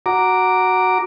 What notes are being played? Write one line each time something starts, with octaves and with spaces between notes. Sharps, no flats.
F#4 A#5 D6